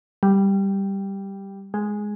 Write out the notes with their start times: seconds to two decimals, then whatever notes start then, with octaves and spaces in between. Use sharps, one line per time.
0.23 G3
1.74 G#3